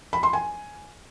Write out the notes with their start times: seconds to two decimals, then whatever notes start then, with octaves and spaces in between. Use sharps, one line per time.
0.13 B5
0.23 C6
0.33 G#5